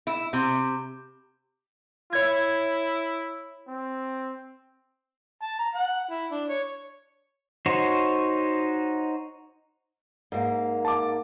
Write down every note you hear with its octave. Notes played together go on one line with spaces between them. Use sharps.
E4
C3
E4 C#5 G#6
C4
A5
A#5
F#5
E4
D4
C#5
D#4 F#4 C5 C#5
G#2 A#3
A5 D6